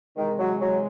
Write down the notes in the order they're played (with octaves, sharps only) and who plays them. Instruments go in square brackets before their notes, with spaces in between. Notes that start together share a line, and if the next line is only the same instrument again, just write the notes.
[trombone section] C3 E3 G#3 [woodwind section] D#3
[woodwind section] F#3
F#3